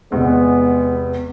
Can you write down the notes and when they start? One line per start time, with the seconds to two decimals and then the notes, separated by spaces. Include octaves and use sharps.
0.12 E2 C3 G#3 B3